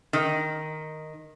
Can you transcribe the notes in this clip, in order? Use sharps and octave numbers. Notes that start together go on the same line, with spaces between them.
D#3